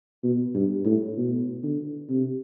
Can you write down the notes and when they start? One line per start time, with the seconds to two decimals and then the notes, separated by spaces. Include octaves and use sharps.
0.24 B2
0.54 G2
0.85 A2
1.17 B2
1.63 D3
2.09 C3